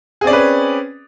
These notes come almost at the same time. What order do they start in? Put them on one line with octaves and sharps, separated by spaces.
G#4 C4 D5 C#4 B4